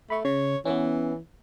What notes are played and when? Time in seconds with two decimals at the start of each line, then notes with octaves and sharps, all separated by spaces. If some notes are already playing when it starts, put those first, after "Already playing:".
0.10 A3 B5 C#6
0.25 C#3 C#5
0.65 E3 B3 C#4